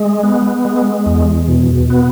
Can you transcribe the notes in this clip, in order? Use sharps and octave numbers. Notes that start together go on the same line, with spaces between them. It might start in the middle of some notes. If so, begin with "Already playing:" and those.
Already playing: G#3
B3
G#3
E2
B2
B3